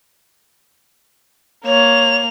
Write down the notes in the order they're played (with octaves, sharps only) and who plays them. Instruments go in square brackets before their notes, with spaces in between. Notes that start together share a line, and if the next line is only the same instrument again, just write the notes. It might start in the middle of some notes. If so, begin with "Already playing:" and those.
[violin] A#3 F7 [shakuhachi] C#5